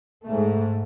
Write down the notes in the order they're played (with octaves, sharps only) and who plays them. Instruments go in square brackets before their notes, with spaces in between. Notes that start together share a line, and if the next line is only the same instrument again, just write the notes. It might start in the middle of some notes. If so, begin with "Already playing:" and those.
[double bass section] G#2 A3